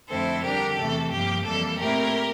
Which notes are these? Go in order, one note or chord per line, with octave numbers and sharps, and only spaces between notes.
F2 D3 A3 C4 E4 A4 C5
D3 G3 D4 G4 A#4
E2 C3 E3 A3 A4
G2 F3 A#3 G4
F2 E3 G3 A#3 A4
A#2 A3 C4 E4 G4 A#4